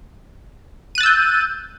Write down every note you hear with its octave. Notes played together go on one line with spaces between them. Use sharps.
E6 F#6 G6 A6 D#7